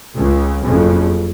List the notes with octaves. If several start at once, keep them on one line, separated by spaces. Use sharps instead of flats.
C#2 C#3
F#1 F2 C#3